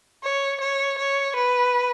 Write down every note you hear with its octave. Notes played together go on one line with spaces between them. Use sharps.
C#5
C#5
C#5
B4